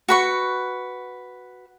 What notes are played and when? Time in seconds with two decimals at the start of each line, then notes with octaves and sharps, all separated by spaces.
0.08 F#4 B4 C#6